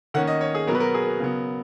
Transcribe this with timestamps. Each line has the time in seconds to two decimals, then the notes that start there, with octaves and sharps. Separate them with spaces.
0.14 D#3 A#3 C#4 F#5
0.27 D#5
0.41 C#5
0.55 G#4
0.67 B2 F#3 B3 A#4
0.75 B4
0.80 A#4
0.94 G#4
1.07 A#4
1.20 C#3 F#3 B3